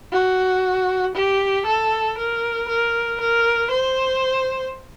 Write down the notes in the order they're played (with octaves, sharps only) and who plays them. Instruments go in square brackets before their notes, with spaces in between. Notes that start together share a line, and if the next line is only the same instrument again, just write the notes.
[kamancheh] F#4
G4
A4
A#4
A#4
A#4
C5